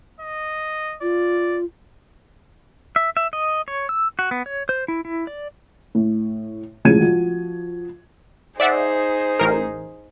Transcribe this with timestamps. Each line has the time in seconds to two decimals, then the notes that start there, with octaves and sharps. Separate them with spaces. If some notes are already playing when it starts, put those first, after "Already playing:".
0.20 D#5
1.02 F4 D5
2.96 E5
3.17 E5
3.33 D#5
3.68 C#5
3.89 E6
4.19 F#4
4.31 B3
4.46 C#5
4.69 C5
4.88 E4
5.05 E4
5.27 D5
5.95 A2
6.85 E1 A1 C#3 F3 G#6 D#7
7.01 F3 F#4
8.60 D#4 G#4 C5 D5 E5 F#5
9.39 A1 A#4